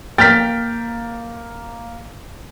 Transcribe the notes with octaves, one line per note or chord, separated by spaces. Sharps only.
A#3 G5 F6 A6 B6